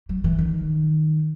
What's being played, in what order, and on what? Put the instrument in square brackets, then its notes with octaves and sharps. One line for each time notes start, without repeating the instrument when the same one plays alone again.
[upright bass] F#3
E3
D#3